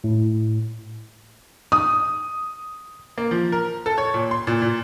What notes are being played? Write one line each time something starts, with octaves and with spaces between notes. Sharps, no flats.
A2
D#6
A#3
F3
A#4
A4
C#5
A#2
C6
A#2
A#2